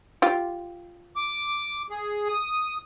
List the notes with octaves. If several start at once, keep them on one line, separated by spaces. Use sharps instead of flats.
F4 G4
D6
G#4
D#6